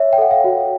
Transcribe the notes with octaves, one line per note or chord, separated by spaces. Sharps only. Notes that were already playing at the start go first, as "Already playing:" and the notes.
Already playing: C#5 E5
G5
A4 F#5
F5
F#4